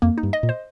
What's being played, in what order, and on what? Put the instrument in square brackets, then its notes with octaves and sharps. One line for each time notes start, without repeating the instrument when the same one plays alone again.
[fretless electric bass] F2 [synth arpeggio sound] A#3
[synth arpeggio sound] D#4
[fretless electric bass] G2
[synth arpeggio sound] D#5
[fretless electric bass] A#2
[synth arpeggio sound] C5